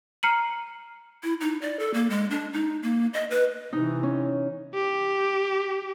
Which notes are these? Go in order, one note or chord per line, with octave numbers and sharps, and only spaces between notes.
A#5 F6 C7 C#7 D#7 F#7
E4
D#4
D5
A4
A#3
G#3
D4
D#4
A#3
D#5
B4
C3 E3 D#4
C#4
G4